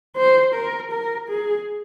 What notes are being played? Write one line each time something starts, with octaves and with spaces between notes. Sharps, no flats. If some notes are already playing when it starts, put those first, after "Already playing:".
C5
A#4
A#4
G#4